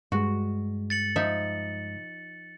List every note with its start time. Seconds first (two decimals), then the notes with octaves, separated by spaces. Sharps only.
0.12 G2 G#3 F#4
0.90 A6 C#7 F#7
1.16 F3 D#4 E5